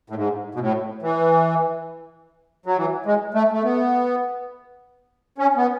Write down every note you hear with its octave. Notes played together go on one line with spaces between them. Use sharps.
A2
G#2
B2
A2
E3
F#3
E3
G#3
A3
A3
B3
C#4
B3